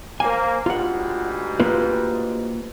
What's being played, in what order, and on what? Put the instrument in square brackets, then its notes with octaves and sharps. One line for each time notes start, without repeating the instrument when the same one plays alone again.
[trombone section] A#3 [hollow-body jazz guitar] C5 G#5
[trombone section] D2 G#2 G3 [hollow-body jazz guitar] F4 F#5
[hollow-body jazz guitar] A#3 F4 B4